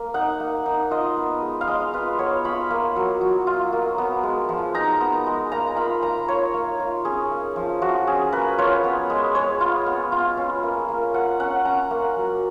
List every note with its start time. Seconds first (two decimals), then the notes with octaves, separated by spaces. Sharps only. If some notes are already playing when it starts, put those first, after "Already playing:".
Already playing: A#3
0.14 D#4 F#5
0.40 A#3
0.66 D#4
0.91 F4 D#5
1.17 B3
1.42 G#3
1.61 F5
1.67 G#3 D#5
1.93 F4 B4
2.19 B3 C#5
2.44 F4 B5
2.70 A#3
2.96 F#3
3.21 F#3
3.47 F4
3.73 A#3
3.98 B3
4.23 G#3
4.49 F3
4.74 D#4 A#5
5.01 B3
5.26 G#3
5.52 A#3 A#5
5.76 F4 B5
6.03 A#3 A#5
6.28 F4 C#5
6.54 A#3
6.79 F4
7.05 C#4 G#4
7.31 A#3
7.56 F3
7.82 F3 F#4
8.07 C#4 G#4
8.32 A#3 B4
8.58 F4 C#5
8.84 B3
9.10 G#3
9.35 G#3 C#5
9.61 F4
9.86 B3
10.12 F4
10.37 C#4
10.63 A#3
10.88 A#3
11.14 F4 F#5
11.39 C#4 F#5
11.65 C#4 A#5
11.91 A#3
12.17 F#3